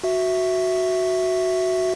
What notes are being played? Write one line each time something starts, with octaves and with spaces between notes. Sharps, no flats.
F#4 E5